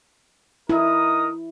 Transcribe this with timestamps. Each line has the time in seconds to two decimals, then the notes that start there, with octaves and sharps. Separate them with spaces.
0.69 D#4 E4 A#4 D#6